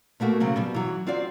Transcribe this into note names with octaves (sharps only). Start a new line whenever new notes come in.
B2 A3 A#3 F#4
C#3 F#3 C4
B2 G3
E3 F#3
C4 F4 F#4 D5